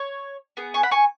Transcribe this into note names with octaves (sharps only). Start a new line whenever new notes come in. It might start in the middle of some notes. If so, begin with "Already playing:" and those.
Already playing: C#5
B3 G#4
G#5 C#6
F#5 B5
G#5 C#6